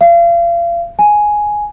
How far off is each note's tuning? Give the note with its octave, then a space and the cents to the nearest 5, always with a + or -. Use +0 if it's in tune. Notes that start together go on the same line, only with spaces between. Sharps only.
F5 -35
G#5 +5